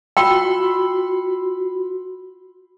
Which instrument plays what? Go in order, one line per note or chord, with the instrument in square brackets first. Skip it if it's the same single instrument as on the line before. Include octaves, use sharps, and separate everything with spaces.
[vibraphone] F4 F#4 [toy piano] G5 [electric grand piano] B5 C6 E6